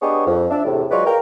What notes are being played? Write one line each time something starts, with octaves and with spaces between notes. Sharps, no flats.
B3 D4 G4 G#4 C#5 D#5
F2
D4 E5
E2 A2 C3
F#3 G#3 F4 B4 C#5 D5
A#4 F5 G5